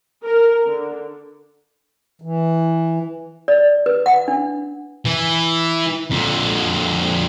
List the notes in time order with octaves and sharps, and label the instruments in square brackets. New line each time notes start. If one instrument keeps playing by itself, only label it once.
[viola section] A#4
D3
[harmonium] E3
[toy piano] D5
B4
F#5
D4
[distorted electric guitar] E3
F2 D3